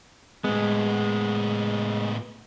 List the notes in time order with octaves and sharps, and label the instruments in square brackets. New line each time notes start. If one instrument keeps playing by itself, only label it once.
[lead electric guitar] A2 B3 [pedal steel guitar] G#3